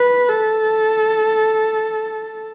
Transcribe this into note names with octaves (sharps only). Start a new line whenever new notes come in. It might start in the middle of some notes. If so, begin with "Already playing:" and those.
Already playing: B4
A4